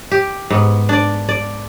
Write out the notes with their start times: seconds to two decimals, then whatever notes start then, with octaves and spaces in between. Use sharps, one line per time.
0.12 G4
0.50 G#2 B3
0.89 D4 D5
1.29 D5